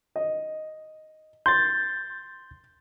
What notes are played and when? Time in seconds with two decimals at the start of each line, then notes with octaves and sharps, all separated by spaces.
0.16 D#5
1.46 C6 G6 A6